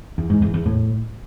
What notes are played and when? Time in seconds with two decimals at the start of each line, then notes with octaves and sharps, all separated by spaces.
0.18 E2
0.30 G#2
0.42 E2
0.54 E2
0.66 A2